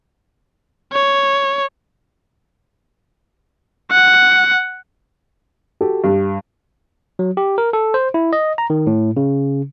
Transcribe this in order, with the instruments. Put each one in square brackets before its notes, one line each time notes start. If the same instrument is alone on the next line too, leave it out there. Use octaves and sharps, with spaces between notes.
[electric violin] C#5
F#5
[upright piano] F#4 G4 A4
G2
[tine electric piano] F#3
G4
A#4
A4
C5
E4
D#5
A#5
D#3
A2
C#3